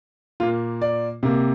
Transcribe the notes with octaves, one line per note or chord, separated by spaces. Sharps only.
A#2 A#3 F4
D5
C3 A#3